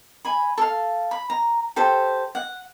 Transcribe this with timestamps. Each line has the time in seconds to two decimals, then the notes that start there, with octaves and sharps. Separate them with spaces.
0.25 G#5 B5
0.58 A4 F5
1.11 B5
1.30 A#5
1.76 G4 A4 C5
2.35 F#5